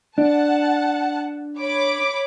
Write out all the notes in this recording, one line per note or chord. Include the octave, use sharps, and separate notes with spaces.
D4 F#5 A5
C#5 B5 D6